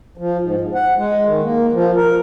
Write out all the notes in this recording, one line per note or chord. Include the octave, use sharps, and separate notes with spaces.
F3
G#2
E2
F#5
G#3
D#3
A#3
F3
A#4